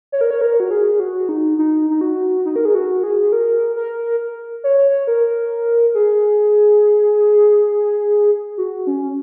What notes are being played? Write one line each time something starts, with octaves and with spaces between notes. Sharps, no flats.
C#5
A#4
C#5
A#4
F#4
G#4
F#4
D#4
D#4
D#4
F#4
D#4
A#4
G#4
F#4
G#4
A#4
A#4
C#5
A#4
G#4
F#4
C#4